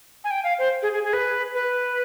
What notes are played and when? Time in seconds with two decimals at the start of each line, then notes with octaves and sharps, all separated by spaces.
0.24 G#5
0.31 G5
0.44 F5
0.59 C5
0.82 G#4
0.93 G#4
1.03 G#4
1.13 B4
1.54 B4